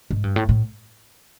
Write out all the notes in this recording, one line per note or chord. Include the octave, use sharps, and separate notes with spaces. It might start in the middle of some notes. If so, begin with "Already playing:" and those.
G#2
G2
A2
A2